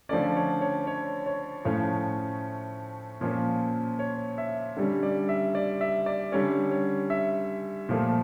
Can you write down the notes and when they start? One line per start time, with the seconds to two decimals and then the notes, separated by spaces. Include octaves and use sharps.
0.09 D3 F3 A3 C#4 D5
0.36 C#5
0.61 C#5
0.87 C#5
1.26 C#5
1.65 A2 F3 A3 C#4 C#5
3.21 A#2 F3 C#4
3.99 C#5
4.38 E5
4.77 D3 G3 C#4
5.03 D5
5.29 E5
5.55 D5
5.81 E5
6.06 D5
6.32 D3 G3 C#4 C#5
6.71 C#5
7.10 E5
7.89 A#2 F3 A3